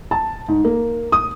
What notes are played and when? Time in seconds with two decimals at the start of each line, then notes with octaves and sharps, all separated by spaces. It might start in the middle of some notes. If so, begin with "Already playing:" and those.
0.11 A5
0.48 G#2
0.65 A#3
1.12 D#6